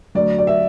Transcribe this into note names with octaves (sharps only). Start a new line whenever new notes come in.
D2 D3 F#3 D5
D5
E5